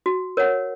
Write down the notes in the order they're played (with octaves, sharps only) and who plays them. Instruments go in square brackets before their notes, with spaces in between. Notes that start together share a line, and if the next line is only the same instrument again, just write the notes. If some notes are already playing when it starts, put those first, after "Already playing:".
[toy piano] F#4
A#4 C#5 F#5